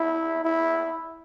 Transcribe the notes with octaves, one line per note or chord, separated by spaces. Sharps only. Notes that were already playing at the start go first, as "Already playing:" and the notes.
Already playing: E4
E4